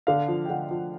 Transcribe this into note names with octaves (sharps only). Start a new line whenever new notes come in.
D3 F5
F3
G5
D3 F#5
F3